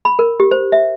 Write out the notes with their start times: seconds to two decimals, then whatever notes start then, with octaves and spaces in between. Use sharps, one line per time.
0.05 B5
0.19 A#4
0.40 G4
0.51 C5
0.72 E5